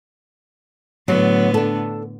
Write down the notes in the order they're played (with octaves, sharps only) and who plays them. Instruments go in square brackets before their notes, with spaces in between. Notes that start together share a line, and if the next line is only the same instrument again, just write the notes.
[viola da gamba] A2 D3 B3 [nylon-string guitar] F#3
[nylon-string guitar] D4 A4